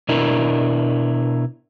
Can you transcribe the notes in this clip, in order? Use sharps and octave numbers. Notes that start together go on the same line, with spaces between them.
B2 D4 E4 A#4